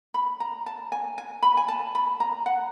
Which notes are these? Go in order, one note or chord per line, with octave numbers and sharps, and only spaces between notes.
B5
A#5
A5
G#5
G#5
B5
G#5
A5
B5
A#5
F#5